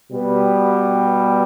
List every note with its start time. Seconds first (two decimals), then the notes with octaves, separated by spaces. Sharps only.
0.10 B2 G3 B3